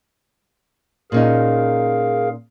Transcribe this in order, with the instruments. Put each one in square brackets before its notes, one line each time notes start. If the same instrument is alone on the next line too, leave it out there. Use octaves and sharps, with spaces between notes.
[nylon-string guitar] A#2 C#4 D#4 [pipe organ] G#4 A#4 F5